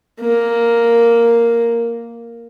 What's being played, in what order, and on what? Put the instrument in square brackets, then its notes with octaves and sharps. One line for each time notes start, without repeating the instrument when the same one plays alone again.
[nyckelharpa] A#3